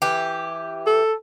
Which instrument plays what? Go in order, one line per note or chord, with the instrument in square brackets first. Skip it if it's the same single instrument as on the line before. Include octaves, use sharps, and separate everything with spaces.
[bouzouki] E3 G4
[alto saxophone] A4